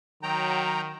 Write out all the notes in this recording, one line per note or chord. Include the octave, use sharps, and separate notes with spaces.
D#3 F#3 G5 A#5